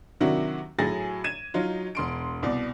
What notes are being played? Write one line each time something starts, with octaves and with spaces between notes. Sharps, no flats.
C3 D#3 F#3 D4 E4 F#4
A2 F#3 G#4 G#5 A6 A#6
G#6 D#7 E7
F#3 D#4 F4
E1 C6 D7
C2 B2 D5